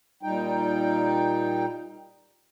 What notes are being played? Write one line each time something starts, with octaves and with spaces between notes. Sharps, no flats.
A#2 G3 D#4 G5